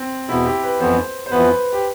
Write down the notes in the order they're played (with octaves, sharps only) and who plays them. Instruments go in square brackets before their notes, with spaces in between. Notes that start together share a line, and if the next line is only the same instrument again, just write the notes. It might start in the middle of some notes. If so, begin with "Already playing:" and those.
Already playing: [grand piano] C4
[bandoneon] E2 B2 B3 [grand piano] E4
[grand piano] G4
B4
[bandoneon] F2 E3 B3 [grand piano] C5
[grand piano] C5
[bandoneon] F2 E3 B3 [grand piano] B4
[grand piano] G4